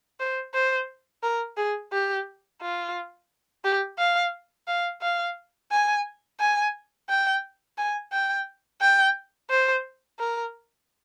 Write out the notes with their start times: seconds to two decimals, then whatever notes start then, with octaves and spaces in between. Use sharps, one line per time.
0.20 C5
0.54 C5
1.23 A#4
1.57 G#4
1.92 G4
2.61 F4
3.64 G4
3.99 F5
4.68 F5
5.02 F5
5.72 G#5
6.40 G#5
7.09 G5
7.78 G#5
8.12 G5
8.81 G5
9.50 C5
10.19 A#4